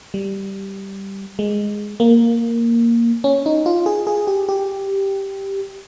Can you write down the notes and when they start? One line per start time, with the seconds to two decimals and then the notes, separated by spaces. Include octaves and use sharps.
0.14 G3
1.39 G#3
2.00 A#3
3.24 C#4
3.46 D#4
3.66 F4
3.86 G#4
4.07 G#4
4.27 G4
4.49 G4